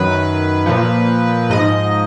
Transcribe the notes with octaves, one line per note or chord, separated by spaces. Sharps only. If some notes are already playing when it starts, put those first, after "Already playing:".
Already playing: F#2 D#3 F#3 B4
A#2 F3
G#2 F3 D#5